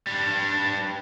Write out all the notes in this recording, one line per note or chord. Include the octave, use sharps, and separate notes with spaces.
G3 D4